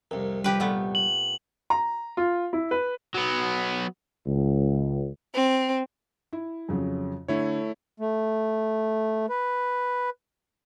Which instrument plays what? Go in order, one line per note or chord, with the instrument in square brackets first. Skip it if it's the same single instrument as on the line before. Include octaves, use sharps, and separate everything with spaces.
[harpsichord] C2 F2 [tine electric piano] A#4
[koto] F3 G4 B4 [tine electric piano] G3
[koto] A#2 A3 B3
[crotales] F#7
[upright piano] A#5
F4
E4
B4
[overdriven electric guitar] F#3 B3
[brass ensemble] C#2
[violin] C4
[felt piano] E4
F2 C#3 F#3
[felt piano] D3 [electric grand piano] A3 E4 C#5
[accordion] A3
B4